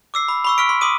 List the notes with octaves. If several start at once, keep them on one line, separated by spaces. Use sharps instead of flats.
D6 E6 C7
B5
B5 C#6 E6
C#6 F6 B6 D7
C6
C6 D6 D#6 D#7